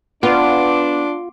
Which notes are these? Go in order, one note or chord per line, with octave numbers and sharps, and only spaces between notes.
B3 D4 F4 C6 D6